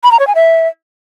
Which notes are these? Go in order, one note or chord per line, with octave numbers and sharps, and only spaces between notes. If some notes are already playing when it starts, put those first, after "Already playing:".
B5
A#5
C#5
G#5
E5